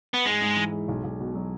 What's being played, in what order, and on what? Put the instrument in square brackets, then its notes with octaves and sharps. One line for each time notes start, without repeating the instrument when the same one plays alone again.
[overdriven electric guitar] B3
[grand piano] G#2 [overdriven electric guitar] G#3
[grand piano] G#2
E3
G#3
B1
B1
B2
F#3